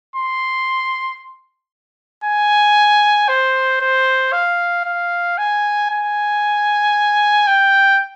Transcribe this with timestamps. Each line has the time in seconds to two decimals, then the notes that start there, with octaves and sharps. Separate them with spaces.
0.16 C6
2.24 G#5
3.29 C5
3.81 C5
4.33 F5
4.85 F5
5.38 G#5
5.90 G#5
7.47 G5